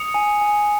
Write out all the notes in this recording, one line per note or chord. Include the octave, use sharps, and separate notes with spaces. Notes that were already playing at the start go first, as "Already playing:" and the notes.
Already playing: D#6 C#7 F7
G#5
G#5